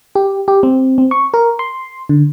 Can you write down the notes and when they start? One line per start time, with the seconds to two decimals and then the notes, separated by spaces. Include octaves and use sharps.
0.15 G4
0.48 G4
0.63 C4
0.98 C4
1.11 C#6
1.34 A#4
1.59 C6
2.09 D3